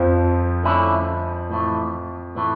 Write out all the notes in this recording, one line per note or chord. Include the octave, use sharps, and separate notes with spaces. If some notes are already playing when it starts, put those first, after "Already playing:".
Already playing: F2 F3
D3 A3 C#4 E4
A2 E3 A3
A2 E3 A3